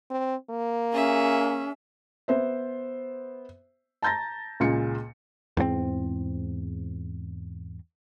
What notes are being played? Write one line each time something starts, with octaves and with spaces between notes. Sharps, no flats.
C4
A#3
C#4 G#4 E5
B3 C5 E5
A5 A#5 G6 A6 A#6
C#2 A#2 G#4 C#7
E2 G#2 A#3 C4